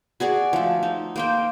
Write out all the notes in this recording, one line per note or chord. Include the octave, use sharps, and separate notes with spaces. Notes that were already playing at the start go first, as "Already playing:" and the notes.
F#4 G#4 D5
F3 A3
D#4
A#3 C5 G5